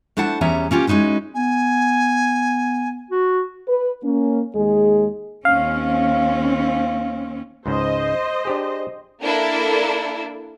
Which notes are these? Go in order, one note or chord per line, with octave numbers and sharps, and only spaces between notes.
A3 D4 E4 C5 F#5 A5
E2 G3 B3 C#4 E5 A#5
A#3 C#4 F4 G4
G#3 C#4 D#4 E4 F#4
B3 G#5
F#4
B4
A#3 C#4
D#2 G#3 G#4
D#2 C4 C#4 F5
C#2 G#2 C#3 C5 D#5
D4 G4 G#4
A#3 D4 E4 A4